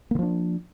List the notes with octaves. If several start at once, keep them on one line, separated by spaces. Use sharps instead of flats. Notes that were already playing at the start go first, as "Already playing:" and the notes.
D3 F3 A#3 D4